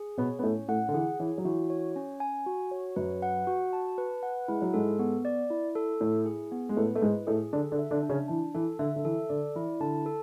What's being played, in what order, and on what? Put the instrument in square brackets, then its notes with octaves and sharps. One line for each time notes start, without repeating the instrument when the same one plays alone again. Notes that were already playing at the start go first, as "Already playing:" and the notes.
Already playing: [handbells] G#4
[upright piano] B2 B3 [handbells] C#5
[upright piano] B3
[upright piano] A2 A3 [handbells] C#4
[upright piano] A2 A3 [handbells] F#5
[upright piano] D3
[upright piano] E3 [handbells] G#4
[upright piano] E3 [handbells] C#5
[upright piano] F#3
[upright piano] E3 [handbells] F#4
[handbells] C#5
C#4
G#5
F#4
C#5
[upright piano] F#2 F#3 [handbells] B4
[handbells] F#5
F#4
A5
B4
F#5
[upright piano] G#3 [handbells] E4
[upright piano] F#3
[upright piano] G#2 G#3 [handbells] A4
[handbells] B3
D5
E4
A4
[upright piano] A2 A3 [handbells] E4
[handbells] G#4
B3
[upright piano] G#3
[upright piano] A2 A3 [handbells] B4
[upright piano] A3
[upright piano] G#2 G#3 [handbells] E4
[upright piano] A2 A3 [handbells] G#4
[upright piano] D3 D4 [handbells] A4
[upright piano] D3 D4
[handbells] E5
[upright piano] D3 D4
[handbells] D4
[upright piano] C#3 C#4
[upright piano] E3 [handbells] A5
[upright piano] E3 [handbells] A4
[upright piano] D3 [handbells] E5
[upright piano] D3
[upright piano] E3 [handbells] A4
[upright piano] D3 [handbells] D5
[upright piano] E3 [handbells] E4
[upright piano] D3 [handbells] A5
[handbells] A4